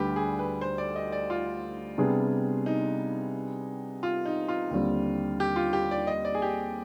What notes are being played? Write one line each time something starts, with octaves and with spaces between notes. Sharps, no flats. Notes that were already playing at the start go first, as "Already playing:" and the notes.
Already playing: D2 D3 G3 G4 B4
G#4
B4
C5
D5
D#5
D5
F4
C3 G3 B3 D4 G#4
D#4
F4
D#4
F4
D#2 D3 G3 C4
G4
F4
G4
D5
D#5
D5
G#4
G4